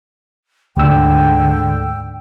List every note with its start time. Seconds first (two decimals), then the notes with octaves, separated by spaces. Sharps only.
0.77 D2 G#2 D3 G5 E6